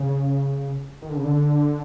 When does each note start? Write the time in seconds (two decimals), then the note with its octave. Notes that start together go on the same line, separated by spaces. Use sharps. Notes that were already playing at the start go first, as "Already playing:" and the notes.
Already playing: C#3
1.02 D#3
1.09 D3
1.17 C#3
1.24 D3